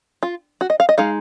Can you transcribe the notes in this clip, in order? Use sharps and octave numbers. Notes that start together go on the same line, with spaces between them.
F4
F#4
D#5
F5
D#5
G#3 D#4 F5